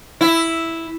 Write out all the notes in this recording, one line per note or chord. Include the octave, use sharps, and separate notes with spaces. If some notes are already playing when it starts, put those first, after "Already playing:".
E4